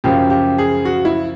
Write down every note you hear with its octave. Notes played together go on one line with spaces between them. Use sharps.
F#2 C#3 F3 G4
G4
G#4
F#4
E4